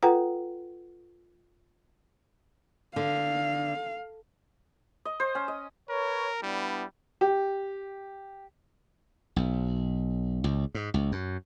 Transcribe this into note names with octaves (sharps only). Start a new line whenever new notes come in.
F4 A4 B4 F#5 G5 A#5
D3 F5
D#5
C5
C#4
D#5
A#4 B4 C#5
G3 B3 D4 E4
G4
B1
C#2
G#2
C#2
F#2